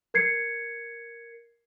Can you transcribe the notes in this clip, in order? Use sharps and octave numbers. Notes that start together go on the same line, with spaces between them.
A#4 G#6 C7 C#7